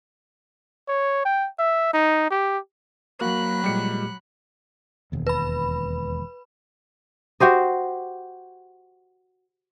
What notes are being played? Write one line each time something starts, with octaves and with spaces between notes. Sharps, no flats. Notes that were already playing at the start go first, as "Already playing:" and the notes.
C#5
G5
E5
D#4
G4
F#3 A#3 F#4 B5 F#6
A#2 G3 G#3 G4 C#7
E1 D#2
B4 B5
F#4 G4 C5 D#5